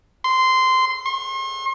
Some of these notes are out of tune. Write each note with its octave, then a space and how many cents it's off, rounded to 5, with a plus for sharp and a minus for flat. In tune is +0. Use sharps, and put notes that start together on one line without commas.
C6 -15
C6 +40